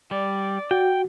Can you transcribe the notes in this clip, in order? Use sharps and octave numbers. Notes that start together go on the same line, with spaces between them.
G3 D5
F#4 G5